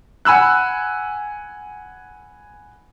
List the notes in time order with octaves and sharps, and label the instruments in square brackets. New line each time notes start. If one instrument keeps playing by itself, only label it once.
[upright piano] F#5 G#5 B5 E6 F#6